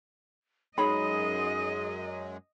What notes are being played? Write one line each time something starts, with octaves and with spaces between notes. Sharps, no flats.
F#2 F#3 G#3 D#4 G#4 C#5 D#5 B5